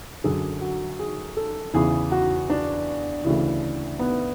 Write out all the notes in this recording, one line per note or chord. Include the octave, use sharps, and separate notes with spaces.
F#2 D3 G#4
F#4
G#4
A4
E2 C#3 E3 G#4
F#4
D4
D2 C#3 E3
B3